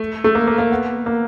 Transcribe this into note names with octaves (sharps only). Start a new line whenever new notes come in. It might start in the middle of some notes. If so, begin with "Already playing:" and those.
Already playing: A3
A3
A#3
A#3
A#3
B3
A#3